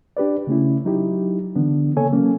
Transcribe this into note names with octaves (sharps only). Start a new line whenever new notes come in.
D4 G4 B4 D5
C#3 A3 C#4 E4
F#3 D#4 E4 G4
D3 E3 B3 D4
C#3 A#3 A4 C#5 G#5
F#3 A#3 C#4